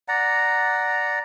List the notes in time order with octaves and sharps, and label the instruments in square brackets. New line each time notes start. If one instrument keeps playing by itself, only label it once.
[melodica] D5 F#5 A#5